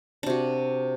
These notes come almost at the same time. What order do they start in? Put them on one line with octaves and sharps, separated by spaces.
D4 C3 F#4